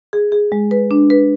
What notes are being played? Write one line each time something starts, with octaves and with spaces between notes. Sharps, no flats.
G#4
G#4
G#3
B4
D4
B4